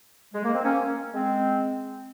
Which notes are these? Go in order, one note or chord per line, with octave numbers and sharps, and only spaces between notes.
G#3
A#3
C4
A#3 C#4
G#3 C4